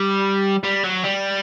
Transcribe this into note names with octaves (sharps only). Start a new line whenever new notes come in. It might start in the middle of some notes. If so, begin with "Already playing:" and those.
Already playing: G3
G3
F#3
G3